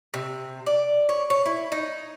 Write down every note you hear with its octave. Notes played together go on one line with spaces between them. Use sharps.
C3
D5
C#5
C#5
E4
D#4